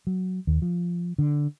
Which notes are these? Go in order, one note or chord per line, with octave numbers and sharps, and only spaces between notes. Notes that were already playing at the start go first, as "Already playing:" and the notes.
F#3
D#2
F3
D3